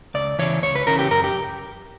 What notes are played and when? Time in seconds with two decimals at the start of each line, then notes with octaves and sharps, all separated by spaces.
0.14 C#2 D5
0.39 C#3 E3 C#5
0.63 C#2 C#5
0.75 B4
0.87 C#3 E3 A#4
0.99 G4
1.11 F#2 A#4
1.24 G4